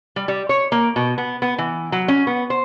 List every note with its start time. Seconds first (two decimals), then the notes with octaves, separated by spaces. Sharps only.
0.16 G3
0.28 G3
0.49 C#5
0.72 A#3
0.96 B2
1.18 B3
1.42 B3
1.58 E3
1.92 F#3
2.08 C#4
2.27 B3
2.50 C5